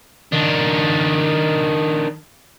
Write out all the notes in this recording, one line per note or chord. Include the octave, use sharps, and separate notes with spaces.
D#3 D4